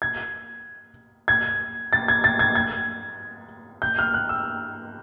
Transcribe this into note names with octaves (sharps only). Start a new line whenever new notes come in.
G#6
G#6
A6
G#6
A6
G#6
G#6
G6
F6
F#6
E6